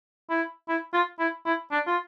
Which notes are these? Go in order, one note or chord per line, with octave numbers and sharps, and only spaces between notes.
E4
E4
F4
E4
E4
D4
F4